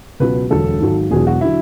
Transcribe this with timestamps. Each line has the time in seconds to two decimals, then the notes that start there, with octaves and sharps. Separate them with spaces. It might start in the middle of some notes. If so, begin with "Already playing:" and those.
0.20 C#2 B2 F#3 B4
0.50 E1 D2 D3 F#3 A4
0.81 G#1 G#2 F#3
1.11 E1 E2 B2 F#3 G#4
1.27 F#4
1.41 D3 F#3 E4